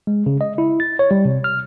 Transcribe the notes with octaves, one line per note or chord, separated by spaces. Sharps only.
G#3
C#3
D#5
E4
A6
C#5
G3
C3
F6